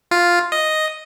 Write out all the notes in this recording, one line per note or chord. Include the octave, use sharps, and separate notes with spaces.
F4
D#5